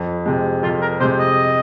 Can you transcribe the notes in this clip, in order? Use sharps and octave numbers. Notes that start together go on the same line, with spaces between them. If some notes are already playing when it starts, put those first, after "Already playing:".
Already playing: F2
C3 G#3
F2 F4
A#4
C3 G#3 C5
D#5